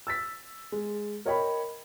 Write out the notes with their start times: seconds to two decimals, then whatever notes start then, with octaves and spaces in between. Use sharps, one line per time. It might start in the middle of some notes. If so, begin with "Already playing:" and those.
0.07 E6 A6 B6
0.72 G#3
1.26 A#4 C#5 D#5 G5 B5